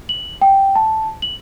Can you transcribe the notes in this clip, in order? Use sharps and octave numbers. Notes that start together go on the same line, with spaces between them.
F#7
G5
A5
F#7